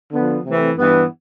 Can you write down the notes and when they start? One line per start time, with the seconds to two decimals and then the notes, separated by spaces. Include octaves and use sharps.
0.12 D3 F3 B3
0.45 C3 E3 A3 C4
0.78 G2 E3 B3